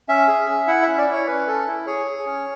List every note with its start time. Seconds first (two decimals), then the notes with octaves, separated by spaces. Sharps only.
0.09 C#4 E5
0.28 G#4
0.48 C#4
0.67 E4 F#5
0.83 C#4 E5
0.98 D5
1.07 E4 C#5
1.27 C#4 B4
1.47 C#4 A4
1.67 E4
1.86 G#4 C#5
2.06 G#4
2.26 C#4